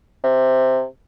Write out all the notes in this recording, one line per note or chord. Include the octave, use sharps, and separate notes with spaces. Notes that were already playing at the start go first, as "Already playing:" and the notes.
C3